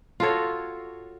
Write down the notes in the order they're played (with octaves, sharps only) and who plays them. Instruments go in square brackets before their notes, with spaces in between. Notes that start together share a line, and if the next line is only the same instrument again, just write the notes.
[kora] F4 F#4 A4 C#5